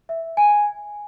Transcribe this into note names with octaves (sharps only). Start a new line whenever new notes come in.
E5
G#5